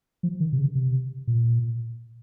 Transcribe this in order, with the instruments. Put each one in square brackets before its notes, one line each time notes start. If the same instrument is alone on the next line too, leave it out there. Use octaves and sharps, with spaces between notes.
[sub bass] F3
D#3
C3
C#3
C3
A#2